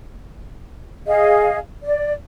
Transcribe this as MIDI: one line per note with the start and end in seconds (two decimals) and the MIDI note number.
1.07 1.57 68
1.07 1.57 75
1.07 1.57 77
1.84 2.13 74